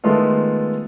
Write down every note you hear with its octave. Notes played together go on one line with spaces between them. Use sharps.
D#3 G#3 A3 B3 F4 A4